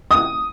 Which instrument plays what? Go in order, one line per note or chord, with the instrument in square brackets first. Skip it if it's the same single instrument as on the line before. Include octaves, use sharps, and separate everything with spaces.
[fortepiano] D#6